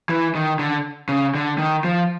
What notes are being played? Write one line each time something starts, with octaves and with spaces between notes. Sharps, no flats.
E3
D#3
D3
C#3
D3
D#3
F3